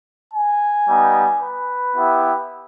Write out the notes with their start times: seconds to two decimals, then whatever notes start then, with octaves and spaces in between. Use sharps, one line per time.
0.33 G#5
0.87 G3 B3 D#4
1.41 B4
1.95 B3 E4 G4